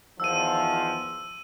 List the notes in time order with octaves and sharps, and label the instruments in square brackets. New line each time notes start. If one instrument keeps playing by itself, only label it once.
[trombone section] E2 D#3 F3 [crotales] E6 D#7